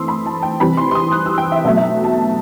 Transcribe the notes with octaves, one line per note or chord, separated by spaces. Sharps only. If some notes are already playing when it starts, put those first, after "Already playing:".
Already playing: E3 A3 C4 C6 D#6 E6
B5
A5
G5
C3 E3 G3 B5
C6
C6
D#6
F#6
E6
G5
E5
B2 F#3 A3 E5
E5
A5